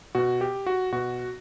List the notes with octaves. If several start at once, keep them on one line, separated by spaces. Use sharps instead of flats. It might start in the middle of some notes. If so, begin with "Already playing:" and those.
B2 F#4
G4
F#4
B2 F#4